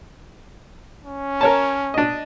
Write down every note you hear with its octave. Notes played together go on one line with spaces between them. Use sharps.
C#4
A#4 C#5 A5
D4 D#5